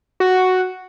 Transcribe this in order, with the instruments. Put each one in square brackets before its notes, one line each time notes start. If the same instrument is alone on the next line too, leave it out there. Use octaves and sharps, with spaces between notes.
[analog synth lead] F#4